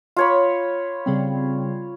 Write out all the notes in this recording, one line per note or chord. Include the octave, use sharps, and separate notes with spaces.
F4 C#5 B5
C#3 G3 C4